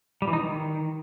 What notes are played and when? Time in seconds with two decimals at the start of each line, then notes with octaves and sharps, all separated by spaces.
0.22 G3
0.28 E3
0.33 D#4
0.39 D#3